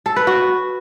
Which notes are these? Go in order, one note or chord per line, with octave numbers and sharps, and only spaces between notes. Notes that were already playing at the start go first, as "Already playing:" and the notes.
A4
B4
F#4